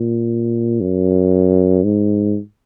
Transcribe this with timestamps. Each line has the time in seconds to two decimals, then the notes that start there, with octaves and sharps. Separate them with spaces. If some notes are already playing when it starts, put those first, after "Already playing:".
Already playing: A#2
0.81 F#2
1.84 G#2